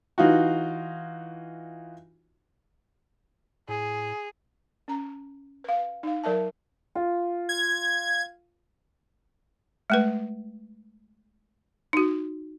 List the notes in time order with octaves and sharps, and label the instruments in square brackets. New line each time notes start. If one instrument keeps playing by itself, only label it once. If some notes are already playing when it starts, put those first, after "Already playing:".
[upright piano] E3 D#4 F4 F#4
[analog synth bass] A2 [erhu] G#4
[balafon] C#4 A#5
B4 F5
D#4 F5
F#3 A#4 E5 A5
[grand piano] F4
[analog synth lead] G#6
[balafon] G#3 A3 B4
D#4 F#4